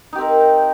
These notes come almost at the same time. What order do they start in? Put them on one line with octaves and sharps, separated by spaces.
D#4 G4 C4 A#4